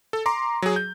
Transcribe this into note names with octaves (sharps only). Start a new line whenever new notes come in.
A4
A#5 C6 D6
F#3 G#4
G6